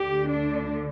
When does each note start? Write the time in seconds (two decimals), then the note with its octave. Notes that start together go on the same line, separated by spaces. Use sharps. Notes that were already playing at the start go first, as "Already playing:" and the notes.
Already playing: D2 D3 G4
0.29 D4